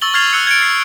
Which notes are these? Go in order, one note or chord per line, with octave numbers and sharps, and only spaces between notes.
C#6 E6 A6 F#7 G7
C#6 F6 G#6 A6 C7 F7
E6 F#6 C#7
G#6 C#7 D7
A6 C7